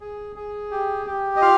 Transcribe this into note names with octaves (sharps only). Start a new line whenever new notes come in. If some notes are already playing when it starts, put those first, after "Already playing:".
G#4
G#4
G4
G4
D#5
F4 F5